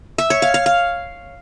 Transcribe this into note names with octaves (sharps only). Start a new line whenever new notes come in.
E5
C#5
F5
F5
F5